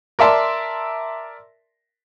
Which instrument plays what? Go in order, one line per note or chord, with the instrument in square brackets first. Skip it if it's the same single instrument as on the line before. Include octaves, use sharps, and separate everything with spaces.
[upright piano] A#4 D5 E5 A5 C6